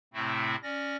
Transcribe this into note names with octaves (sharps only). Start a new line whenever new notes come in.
A2 C3 A3 C4 E4
C#4 D5 A#6